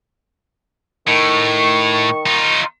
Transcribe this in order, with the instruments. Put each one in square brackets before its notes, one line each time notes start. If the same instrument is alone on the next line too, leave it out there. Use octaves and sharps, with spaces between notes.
[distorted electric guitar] A2 [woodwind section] D#3 C#6
[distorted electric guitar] D#4 F4